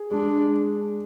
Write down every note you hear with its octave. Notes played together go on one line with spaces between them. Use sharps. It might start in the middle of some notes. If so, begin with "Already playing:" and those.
Already playing: G#4
G#3 D4